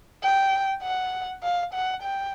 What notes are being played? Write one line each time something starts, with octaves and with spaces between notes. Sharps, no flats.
G5
F#5
F5
F#5
G5